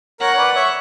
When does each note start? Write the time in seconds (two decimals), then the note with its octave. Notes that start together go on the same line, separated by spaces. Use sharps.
0.20 A#4 C#5 F#5
0.33 C#5
0.38 B4 D5
0.55 C#5 E5